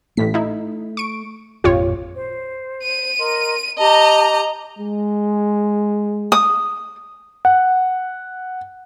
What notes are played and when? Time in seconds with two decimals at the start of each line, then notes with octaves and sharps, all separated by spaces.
0.17 A1 A2 A3 B6
0.34 D#4 E4
0.97 C#6 D7
1.64 G#1 F2 A#2 F4 G4 C#5
2.16 C5
2.83 D#7
3.18 A#4 D#5 C6
3.78 G4 D#5 A5 A#5
4.79 G#3
6.32 D#6
7.45 F#5